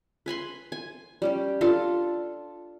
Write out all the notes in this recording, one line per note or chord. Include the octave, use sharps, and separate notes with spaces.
B4 G#5 B5 C6
G#5
G3 C#4 G4
D4 F4 A4